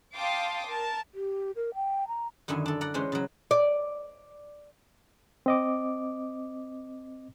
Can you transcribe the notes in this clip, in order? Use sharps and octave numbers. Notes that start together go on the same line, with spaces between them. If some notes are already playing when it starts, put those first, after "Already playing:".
F5 G5 A5 C6 D6 D#6
A#4 A5
G4
A#4
G5
A#5
F#2 D3 D#3 E4 G#5
D4 A4
D5 F#5 A#5
E3 G#3 C#4 C5
C#3 F#3
D5
C4 D#5 D6